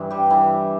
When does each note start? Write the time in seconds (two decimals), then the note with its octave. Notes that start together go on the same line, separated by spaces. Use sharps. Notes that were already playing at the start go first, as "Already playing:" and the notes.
Already playing: G2 E3
0.10 G3 G4
0.30 E3